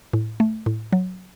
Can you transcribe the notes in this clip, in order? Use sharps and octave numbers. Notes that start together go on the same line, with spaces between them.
A2
A3
A2
F#3